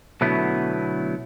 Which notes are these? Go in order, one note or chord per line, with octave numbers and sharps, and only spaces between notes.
B2 D3 F#3 A3 B3 E4